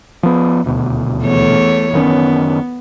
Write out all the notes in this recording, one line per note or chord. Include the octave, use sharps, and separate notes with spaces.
F3 B3
D#1 D2 B2
E2 A3 C#5
F#1 D#3 B3 C#4